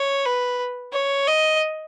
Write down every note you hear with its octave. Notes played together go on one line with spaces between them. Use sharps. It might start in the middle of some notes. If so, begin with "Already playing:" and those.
Already playing: C#5
B4
C#5
D#5